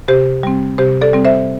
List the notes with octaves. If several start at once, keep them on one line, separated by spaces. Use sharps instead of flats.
C3 G4 C5
G3 C4
C3 G4 C5
A4 D5
G3 C4
C5 E5